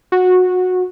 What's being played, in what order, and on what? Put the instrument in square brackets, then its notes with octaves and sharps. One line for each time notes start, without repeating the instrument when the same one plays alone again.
[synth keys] F#4